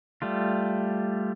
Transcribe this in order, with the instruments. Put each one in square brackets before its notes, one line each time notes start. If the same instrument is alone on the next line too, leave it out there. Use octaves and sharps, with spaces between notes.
[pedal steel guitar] G3 A3 F4